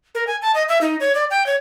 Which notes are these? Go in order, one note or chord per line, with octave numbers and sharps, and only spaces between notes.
A#4
G#5
A5
D#5
E5
D#4
C#5
D5
G5
C#5